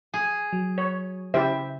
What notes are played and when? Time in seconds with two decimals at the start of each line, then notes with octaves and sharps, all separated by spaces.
0.14 G#4
0.53 F#3
0.78 C#5
1.34 C#3 E4 G4 C5 E5